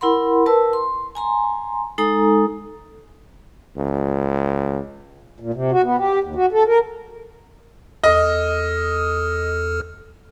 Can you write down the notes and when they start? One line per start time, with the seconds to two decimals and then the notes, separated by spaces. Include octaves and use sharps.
0.01 E4 A#4 F#5 B5 C6
0.46 A#4 B4 A5 E6
0.73 C6
1.15 G#5 A#5 C6
1.98 G#3 D#4 A4 G#5 A#5 D#6
3.77 C#2
5.40 A#2
5.54 C3
5.72 F#4
5.83 B3
5.98 G4
6.23 D#2
6.36 F#4
6.52 A4
6.67 A#4
8.04 E2 A4 D#5 F6